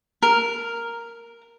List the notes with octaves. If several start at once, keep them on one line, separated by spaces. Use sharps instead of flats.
A#4